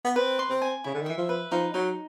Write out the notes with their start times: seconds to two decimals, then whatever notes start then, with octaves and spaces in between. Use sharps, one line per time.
0.04 B3
0.16 C4 B4
0.39 C6
0.50 C4
0.62 G#5
0.84 C#3 E4
0.94 D3
1.02 D#3
1.06 E3 E5
1.18 F3
1.29 B4
1.52 F3 D#4
1.74 F#3 D#4